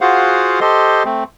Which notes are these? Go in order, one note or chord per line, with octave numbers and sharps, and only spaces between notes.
F4 F#4 G#4 C5 F5 F#5
G4 A4 C5 D#5 C6
A3 C4